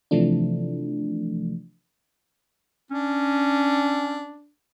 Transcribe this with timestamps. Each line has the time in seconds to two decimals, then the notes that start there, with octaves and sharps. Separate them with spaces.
0.11 C3 E3 F3 A3 D4
2.91 C#4 D4